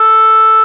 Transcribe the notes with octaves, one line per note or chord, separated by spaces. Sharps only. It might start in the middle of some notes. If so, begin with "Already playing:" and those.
Already playing: A4